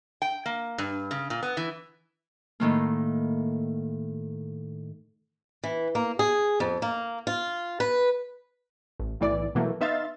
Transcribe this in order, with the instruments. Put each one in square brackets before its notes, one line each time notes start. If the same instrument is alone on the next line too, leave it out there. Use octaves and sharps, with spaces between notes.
[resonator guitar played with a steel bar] G5
A#3
G2
C#3
A#2
B3
E3
[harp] A2 D#3 A#3
[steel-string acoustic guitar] E3
A#3
G#4
F2
A#3
F4
B4
[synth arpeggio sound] A1
B1 A2 E3 D5
B2 E3 F#3 A3 A#3
B3 D#4 E5 F5 C6 A6